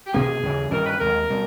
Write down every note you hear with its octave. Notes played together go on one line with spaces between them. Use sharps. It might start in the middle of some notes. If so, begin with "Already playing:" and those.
G4
B2 A#3 C#4 G#4
D#2 C#3 E3
G2 D#3 G3 C#4 A#4
B4
D#2 D#3 G#3 A#4
B2 G3